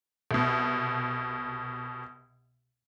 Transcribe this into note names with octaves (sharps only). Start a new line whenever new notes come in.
C2 B2